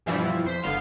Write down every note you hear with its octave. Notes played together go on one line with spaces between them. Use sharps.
G2 B2 E3 F3 G3 E4
F2 C5 B6
G1 D3 B3 F5 C6